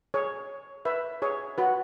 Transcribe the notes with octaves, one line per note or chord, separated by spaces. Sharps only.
G#4 C#5
B4 E5
G#4 C#5
F#4 B4